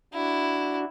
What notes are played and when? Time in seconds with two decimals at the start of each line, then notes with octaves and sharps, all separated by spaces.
0.14 D4 E4 F#4